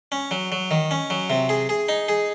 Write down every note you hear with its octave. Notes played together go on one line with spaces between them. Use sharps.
C#4
F#3
F#3
D#3
C#4
F#3
C3
G#4
G#4
D#4
G#4